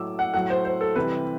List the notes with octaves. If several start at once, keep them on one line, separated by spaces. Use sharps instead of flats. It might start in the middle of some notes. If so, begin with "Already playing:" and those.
Already playing: A2 F#3 D6 E6
F#5
A2 F#3 F#5
C5
C5
A4
C3 E3 G3 B4